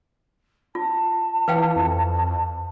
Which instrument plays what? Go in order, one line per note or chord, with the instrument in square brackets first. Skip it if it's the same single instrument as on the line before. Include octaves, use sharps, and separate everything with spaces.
[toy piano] F4 [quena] A5
[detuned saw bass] E3 [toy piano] B4 F5 G5
[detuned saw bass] F2